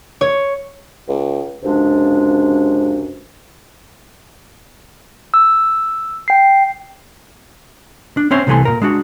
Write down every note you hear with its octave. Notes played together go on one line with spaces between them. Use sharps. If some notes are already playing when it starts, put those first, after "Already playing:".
C#5
C#2
C#2 F#2 C3 F3 G#3 D4
E6
G5 C7
D4
C4 C#4 C5 C#5 E5
C2 C3 E3 A3 G#5 C6
A#2 A#4
G#3 D4 F#4